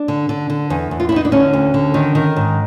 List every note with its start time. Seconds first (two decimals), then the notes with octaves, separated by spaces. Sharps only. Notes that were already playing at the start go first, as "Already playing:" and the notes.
Already playing: D4
0.08 D3
0.29 D3
0.50 D3
0.70 E2
0.91 E2
1.00 F4
1.09 E4
1.12 E2 D#4
1.25 D4
1.32 D3 C#4
1.53 D2
1.74 D3
1.94 D#3
2.15 D#3
2.36 G#2